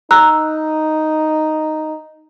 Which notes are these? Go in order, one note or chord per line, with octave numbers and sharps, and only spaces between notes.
D#4 A#5 E6 F#6